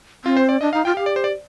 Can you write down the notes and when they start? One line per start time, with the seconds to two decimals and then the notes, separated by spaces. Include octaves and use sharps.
0.25 C4 F4
0.37 C5
0.49 D5
0.61 D4 D#5
0.73 D#4 F5
0.85 F4 G5
0.97 G4 F5
1.06 D5
1.16 C5
1.24 D5